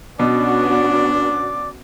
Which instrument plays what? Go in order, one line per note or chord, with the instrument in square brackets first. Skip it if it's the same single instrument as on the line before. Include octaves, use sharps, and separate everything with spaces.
[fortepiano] B2 [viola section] B3 C#4 F#4 [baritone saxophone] D4 [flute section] D5 D6